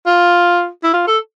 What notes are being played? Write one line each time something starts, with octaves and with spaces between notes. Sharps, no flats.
F4
E4
F4
A4